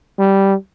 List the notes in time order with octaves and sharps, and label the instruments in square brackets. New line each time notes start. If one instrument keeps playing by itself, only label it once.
[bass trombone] G3